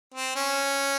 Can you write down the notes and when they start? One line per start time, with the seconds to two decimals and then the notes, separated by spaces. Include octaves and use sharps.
0.14 C4
0.36 C#4